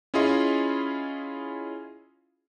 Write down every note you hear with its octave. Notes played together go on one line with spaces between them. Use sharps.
C#4 E4 F4 G#4 D#5 C6